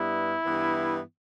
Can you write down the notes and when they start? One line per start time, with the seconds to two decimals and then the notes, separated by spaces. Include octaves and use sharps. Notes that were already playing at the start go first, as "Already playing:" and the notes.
Already playing: G2 G3 B3 E4
0.46 G2 E3 B3